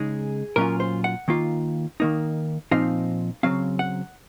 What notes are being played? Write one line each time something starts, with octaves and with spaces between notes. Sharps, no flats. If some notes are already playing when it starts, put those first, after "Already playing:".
Already playing: C#3 G#3 D#4 G#4
A#2 F#3 C#4 F4 A#4
C5
F#5
D#3 A#3 F4
D#3 A#3 D#4
A#2 F3 C4 D#4 F5
C#3 F#3 C4 F5
F#5